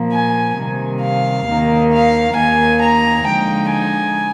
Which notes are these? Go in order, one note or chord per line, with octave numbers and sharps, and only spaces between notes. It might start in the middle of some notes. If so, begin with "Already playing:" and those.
Already playing: A#2 F3 A#3
G#5
C3 D#3 G3
F5
D#2 D#3 A#3
F5
D#2 D#3 A#3 G#5
A#5
D3 F3 G#3 D#4 G5
G#5